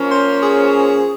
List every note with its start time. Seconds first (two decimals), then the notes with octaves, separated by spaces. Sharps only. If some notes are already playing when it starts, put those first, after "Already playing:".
Already playing: F3 A#3 C#4
0.11 C5
0.42 G#4